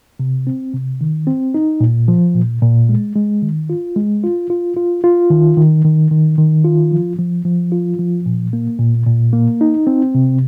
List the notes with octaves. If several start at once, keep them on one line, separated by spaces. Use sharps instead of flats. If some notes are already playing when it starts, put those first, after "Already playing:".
C3
C4
C3
D#3
C4
D#4
A#2
F3
A#2
A#2
G#3
G#3
D#3
F4
G#3
F4
F4
F4
F4
D#3
D#3
D#3
D#3
D#3
F4
F3
F3
F3
F4
F3
A#2
A#3
A#2
A#2
A#3
D#4
C4
C3